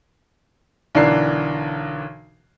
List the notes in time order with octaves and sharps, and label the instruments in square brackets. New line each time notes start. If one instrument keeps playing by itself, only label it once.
[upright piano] B1 D3 E3 D4 A#4 C7